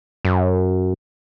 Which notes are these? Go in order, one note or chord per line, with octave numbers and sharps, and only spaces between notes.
F#2